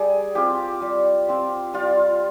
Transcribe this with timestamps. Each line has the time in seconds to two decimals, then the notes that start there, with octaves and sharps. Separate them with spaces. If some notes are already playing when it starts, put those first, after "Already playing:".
Already playing: G3 G#4
0.35 C4 F4 G4
0.82 G3
1.28 C4 F4
1.74 G3 F4